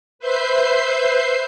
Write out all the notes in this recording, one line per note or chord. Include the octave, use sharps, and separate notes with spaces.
B4 C5 E5 G6 C7